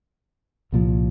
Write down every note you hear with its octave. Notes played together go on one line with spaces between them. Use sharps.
C2 A#2 F3